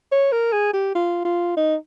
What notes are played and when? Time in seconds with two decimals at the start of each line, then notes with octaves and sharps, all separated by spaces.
0.12 C#5
0.32 A#4
0.52 G#4
0.73 G4
0.95 F4
1.25 F4
1.57 D#4